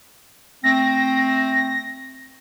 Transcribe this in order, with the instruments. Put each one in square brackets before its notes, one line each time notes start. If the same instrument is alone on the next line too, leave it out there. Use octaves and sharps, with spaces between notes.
[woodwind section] A3 C4 [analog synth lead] A#6